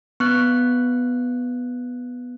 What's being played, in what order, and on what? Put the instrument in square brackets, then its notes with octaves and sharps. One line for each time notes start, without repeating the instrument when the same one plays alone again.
[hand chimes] B3 F#6